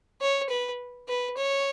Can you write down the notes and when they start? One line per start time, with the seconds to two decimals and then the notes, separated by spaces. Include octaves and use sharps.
0.21 C#5
0.49 B4
1.08 B4
1.37 C#5